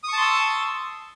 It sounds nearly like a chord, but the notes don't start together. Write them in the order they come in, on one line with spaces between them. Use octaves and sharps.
D#6 C#6 A5 C6 E6